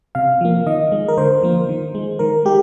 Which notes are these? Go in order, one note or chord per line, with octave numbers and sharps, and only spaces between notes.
C3 F5
F3 A#3
D#3 D#5
G#3
A#4
D3 C5
F3 A#3
D#3
G#3
D#3 A#4
G#3 G4